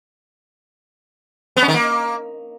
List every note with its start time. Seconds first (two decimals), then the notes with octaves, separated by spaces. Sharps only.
1.57 B3
1.62 C#4
1.68 D#3
1.74 A#3